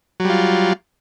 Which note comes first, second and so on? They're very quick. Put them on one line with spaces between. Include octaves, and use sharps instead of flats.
F#3 G3 F4